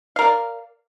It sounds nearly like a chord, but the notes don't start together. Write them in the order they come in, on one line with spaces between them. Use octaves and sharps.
F5 A#4 D5